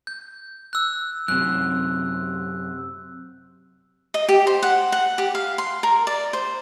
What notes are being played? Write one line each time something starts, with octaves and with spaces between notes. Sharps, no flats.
G6
E6 F#6
F#2 C3 F#6
D#5
G4
C5
F#5
F#5
G4
F5
C6
A#4
D5
C5